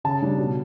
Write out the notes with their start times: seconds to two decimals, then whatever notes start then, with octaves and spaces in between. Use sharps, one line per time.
0.04 C#3 A5
0.22 G3 D4
0.38 B2